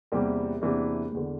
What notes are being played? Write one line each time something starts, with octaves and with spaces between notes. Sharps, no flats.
E2 C3 E3 G3 A#3
E2 C3 E3 A#3 D4
E1 E2 D3